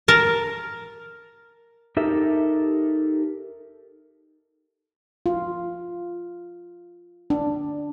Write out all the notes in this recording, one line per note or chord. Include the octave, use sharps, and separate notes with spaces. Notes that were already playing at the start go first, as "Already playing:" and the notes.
A#4 A5
D#4 G4 A4 A#4 E5
F4
D4